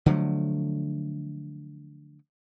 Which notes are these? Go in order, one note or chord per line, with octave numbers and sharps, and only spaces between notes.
D3 F3 F#3 A3